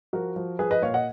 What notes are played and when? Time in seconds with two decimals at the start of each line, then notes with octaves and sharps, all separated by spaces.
0.13 F3 F#4 A#4
0.36 F3
0.59 F3 G#4 B4
0.71 B4 D#5
0.82 A#2 C#5 F5
0.94 D#5 F#5